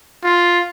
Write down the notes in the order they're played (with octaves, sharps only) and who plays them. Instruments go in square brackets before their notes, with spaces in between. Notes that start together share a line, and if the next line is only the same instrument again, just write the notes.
[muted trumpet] F4